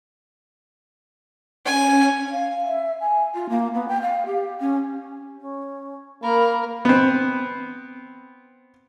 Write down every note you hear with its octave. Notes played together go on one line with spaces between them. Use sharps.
C#4 G#5
F5
E5
G#5
F4
A#3
B3
G5
F5
G4
C#4
C#4
A#3 A#4 B5
B3 C4